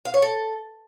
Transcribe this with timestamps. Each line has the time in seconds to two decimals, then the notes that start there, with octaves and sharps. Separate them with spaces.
0.05 F5
0.14 C#5
0.22 A4